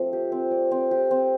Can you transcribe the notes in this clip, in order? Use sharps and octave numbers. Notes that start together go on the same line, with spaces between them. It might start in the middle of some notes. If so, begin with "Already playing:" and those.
Already playing: F3 A3 C4
G4
C4
D5
C4
G4
C4